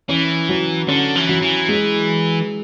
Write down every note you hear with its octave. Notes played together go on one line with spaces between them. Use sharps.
E3 C#4
F#3
D3 C#4
E3
F#3
E3
G#3